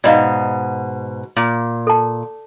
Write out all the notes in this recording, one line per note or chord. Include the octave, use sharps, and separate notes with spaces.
G#2 B2 D5 D#5 F5
A#2
A4 A5